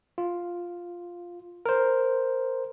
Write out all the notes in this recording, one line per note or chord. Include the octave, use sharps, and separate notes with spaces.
F4
A#4 C5